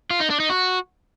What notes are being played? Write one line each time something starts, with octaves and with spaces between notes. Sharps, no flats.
F4
D#4
D4
D#4
F#4